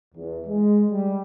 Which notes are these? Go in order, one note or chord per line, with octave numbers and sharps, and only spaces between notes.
E2
G#3
G3